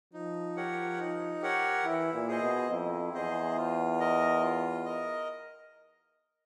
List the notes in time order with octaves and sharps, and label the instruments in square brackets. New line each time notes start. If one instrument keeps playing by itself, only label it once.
[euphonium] F3 [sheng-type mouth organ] D#4
[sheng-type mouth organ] G4 A#4 C#5 F#5
D#4
G4 A#4 C#5 F#5
[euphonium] E3 [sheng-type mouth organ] E4
[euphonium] A#2
[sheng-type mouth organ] G#4 C5 D#5
[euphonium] B2
[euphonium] F2 [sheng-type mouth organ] E4
[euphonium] E2 [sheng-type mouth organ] G#4 C5 D#5
[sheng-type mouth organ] F4
A#4 D#5
F4
A#4 D#5